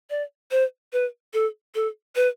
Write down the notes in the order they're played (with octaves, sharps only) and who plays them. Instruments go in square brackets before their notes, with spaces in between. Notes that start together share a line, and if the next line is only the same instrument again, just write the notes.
[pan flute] D5
C5
B4
A4
A4
B4